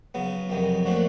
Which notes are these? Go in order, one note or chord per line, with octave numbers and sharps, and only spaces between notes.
C#3 F#3 B3
F2 C3 D#3 F#3
A#2 F3 A3 D4 F#4